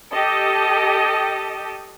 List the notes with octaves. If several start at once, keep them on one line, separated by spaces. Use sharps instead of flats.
G4 A4 D#5